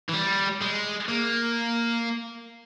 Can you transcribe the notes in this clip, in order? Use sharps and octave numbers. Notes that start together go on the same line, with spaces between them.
E3
G3
G#3
A#3